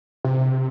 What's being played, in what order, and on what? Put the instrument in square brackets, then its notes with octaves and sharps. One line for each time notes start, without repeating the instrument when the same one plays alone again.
[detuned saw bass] C3